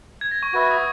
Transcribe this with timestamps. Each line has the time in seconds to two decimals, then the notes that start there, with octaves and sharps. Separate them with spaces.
0.21 G#6
0.31 A#6
0.43 C#6
0.53 F#4 B4 E5 C#6
0.71 D#6